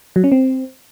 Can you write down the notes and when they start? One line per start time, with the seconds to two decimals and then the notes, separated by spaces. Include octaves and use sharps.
0.16 F#3
0.24 C#4
0.32 C4